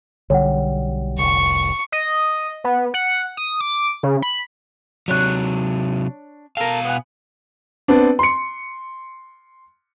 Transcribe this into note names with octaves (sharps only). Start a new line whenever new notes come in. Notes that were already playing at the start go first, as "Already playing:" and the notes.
B1 D3 G3 C#5 F#5
F1 C2 C#6
D#5
B3
F#5
D#6
D6
C#3
B5
C3 F#3 D4 C#5 F#6
B2 A4 A#4 F5
B3 F#5 G#5
B3 C4 D4
C6 C#7